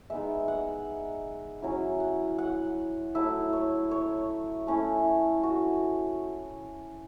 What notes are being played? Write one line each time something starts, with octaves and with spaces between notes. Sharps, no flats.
G#3 B3 D#4 E5
F#5
F#3 C#4 E4
F#5
F#5
F#3 A3 E4 E5
C#5
C#5
A3 C#4 E4
F#4